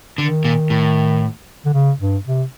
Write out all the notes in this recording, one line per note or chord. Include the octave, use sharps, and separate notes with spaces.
D3 D#3
A#2
A2
D3
C#3
G2
C3